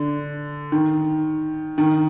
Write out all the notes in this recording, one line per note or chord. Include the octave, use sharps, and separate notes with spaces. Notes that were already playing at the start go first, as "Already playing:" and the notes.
Already playing: D3
D#3
D#3